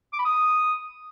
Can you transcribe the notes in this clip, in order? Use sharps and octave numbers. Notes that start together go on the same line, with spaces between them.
D6
B5
D#6